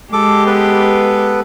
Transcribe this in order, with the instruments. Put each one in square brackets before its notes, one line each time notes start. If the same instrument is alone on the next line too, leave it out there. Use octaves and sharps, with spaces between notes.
[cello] G#3 G4 [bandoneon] A4 D6
[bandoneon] B3 A4 B4